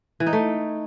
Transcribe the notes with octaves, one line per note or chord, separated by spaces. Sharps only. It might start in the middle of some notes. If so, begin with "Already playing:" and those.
E3
D#4
A3